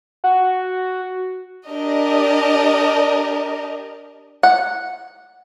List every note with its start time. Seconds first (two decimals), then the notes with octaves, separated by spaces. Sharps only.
0.24 F#4
1.68 D4 G4 A#4 D5 D#5
4.43 F#5